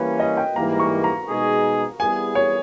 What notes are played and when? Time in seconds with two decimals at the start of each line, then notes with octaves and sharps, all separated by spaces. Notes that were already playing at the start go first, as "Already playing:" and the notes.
Already playing: E3 G3 A#3 C#4 B4
0.20 D#5
0.37 G5
0.55 G#2 E3 G3 A#3 A#5
0.80 C#6
1.04 A#5
1.28 B2 G#3 D#4 G#4
2.00 G3 B3 E4 G#4 G#5
2.35 C#5